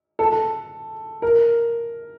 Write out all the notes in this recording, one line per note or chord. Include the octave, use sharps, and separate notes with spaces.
A4
A#4